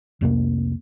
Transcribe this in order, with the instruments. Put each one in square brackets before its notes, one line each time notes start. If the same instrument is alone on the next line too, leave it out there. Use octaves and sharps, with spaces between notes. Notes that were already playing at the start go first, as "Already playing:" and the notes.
[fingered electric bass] C2 F2 C3 A#3